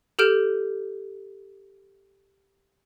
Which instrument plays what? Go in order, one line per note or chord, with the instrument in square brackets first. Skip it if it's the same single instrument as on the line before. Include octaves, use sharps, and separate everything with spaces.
[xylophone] G4 A4 F6 G6 D7 E7